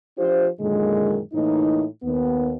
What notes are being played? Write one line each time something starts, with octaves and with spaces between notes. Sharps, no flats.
F3 D4 F4 G4 C5
F#2 A#2 D3 D#3 G#3
A2 E3 A#3 D#4
D#2 B3